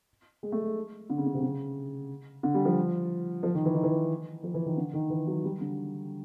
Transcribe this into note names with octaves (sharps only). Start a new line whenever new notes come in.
G#3
A3
G#3
D3
C#3
D3
C3
C#3
D3
G3
F3
F3
D#3
E3
D#3
E3
F3
E3
D#3
D3
D#3
E3
F#3
G3
D3